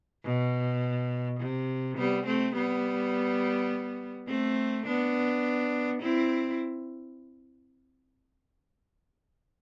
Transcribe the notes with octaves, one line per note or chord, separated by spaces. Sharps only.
B2
C3
G3 B3
A3 C4
G3 B3
A3 C4
B3 D4
C4 E4